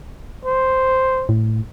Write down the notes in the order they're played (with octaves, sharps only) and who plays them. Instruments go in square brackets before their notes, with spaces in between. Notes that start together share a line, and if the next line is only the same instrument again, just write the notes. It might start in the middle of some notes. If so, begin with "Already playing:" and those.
[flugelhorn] C5
[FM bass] A2